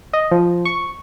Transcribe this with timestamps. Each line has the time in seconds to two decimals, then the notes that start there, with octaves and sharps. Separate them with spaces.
0.13 D#5
0.31 F3
0.65 C#6